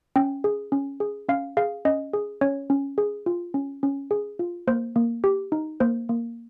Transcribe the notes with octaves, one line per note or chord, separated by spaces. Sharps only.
C#4 G5
G#4
C#4
G#4
C#4 F5
G#4 F5
C#4 D#5
G#4
C#4 C#5
C#4
G#4
F4
C#4
C#4
G#4
F4
A#3 C5
A#3
G4
D#4
A#3 C5
A#3